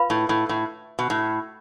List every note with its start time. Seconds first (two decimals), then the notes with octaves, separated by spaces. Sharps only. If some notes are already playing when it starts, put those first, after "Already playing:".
Already playing: F4 B4 F5 B5
0.10 A2
0.29 A2
0.49 A2
0.99 B2
1.10 A2